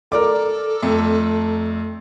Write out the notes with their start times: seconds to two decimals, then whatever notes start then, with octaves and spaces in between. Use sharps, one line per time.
0.12 A4 A#4 D5 D6
0.82 F2 A3